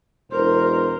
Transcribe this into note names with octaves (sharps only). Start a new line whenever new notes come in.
E1 A#4 C5